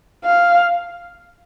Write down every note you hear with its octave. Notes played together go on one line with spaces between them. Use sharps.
F5